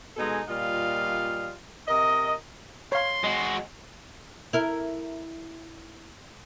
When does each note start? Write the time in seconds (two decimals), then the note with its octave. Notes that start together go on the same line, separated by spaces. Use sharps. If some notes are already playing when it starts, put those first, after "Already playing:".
0.17 B2 G#3 D#4 A4 G#5
0.48 A#2 G3 F4 D#5 F5
1.88 C3 A#4 D#5
2.92 C#5 F5 C6
3.24 G#3 F#4 D#5
4.53 E4 A#4